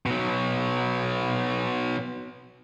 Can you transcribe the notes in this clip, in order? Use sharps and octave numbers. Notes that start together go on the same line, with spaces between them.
B2 F#3